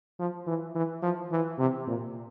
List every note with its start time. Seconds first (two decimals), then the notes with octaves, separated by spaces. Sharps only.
0.19 F3
0.47 E3
0.75 E3
1.03 F3
1.31 E3
1.59 C3
1.87 A#2